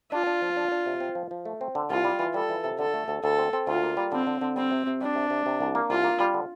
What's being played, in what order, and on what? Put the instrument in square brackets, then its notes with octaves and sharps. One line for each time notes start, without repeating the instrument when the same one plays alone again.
[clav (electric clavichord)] D4 [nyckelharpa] F4
[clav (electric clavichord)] D4
F3
D4
D4
C3
C4
F3
F3
A3
C4
D3
[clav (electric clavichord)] C2 [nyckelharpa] F4
[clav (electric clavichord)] G3
E3
[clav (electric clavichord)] G3 [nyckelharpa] A4
[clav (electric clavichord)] E3
C3
[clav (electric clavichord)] D3 [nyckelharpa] A4
[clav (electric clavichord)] A3
D2
[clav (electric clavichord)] D2 [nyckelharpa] A4
[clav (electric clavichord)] C4
C4
[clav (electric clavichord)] D2 [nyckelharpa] F4
[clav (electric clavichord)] A#3
G3
[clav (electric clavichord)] D3 [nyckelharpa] C4
[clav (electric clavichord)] D3
D3
[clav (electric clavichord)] G3 [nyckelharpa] C4
[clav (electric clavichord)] C3
C3
[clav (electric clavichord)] G3 [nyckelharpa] D4
[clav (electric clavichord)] C3
C3
C3
C2
A#3
[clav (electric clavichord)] C2 [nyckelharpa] F4
[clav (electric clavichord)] A#3
G3
D3